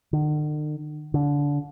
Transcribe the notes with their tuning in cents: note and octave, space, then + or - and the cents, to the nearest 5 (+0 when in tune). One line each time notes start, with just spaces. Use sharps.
D3 +45
D3 -25